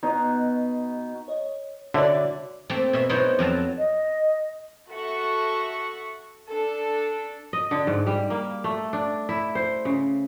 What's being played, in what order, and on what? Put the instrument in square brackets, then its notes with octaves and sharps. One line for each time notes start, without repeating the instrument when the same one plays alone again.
[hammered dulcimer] B2 [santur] D#4
[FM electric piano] C#5 D#5
[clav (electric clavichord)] D3 [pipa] E4 D5 [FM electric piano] F#4 C#5
[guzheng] A3 A#3 C4 A4
B2 E5
F#3 B3 D#4 E4 C5 C#5
F2 F#3 F5 A5
[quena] D#5
[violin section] F#4 A4 E5 F#5 C#6
D4 A4
[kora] D#5
D3
G#2
G3
A#3
A3
D4
E4
C5
C#3